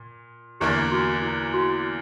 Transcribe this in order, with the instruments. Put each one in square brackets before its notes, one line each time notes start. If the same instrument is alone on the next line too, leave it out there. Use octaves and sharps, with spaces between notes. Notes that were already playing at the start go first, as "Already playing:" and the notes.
Already playing: [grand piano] A#2
[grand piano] E2 D3 A#3 D4 A#4 [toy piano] G4
[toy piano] F#4
E4
F#4